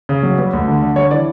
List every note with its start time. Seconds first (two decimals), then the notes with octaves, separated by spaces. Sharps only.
0.09 C#3
0.23 F#3
0.38 G3 B4
0.53 D2
0.68 D3
0.82 D3
0.96 G3 C#5
1.11 E3 D5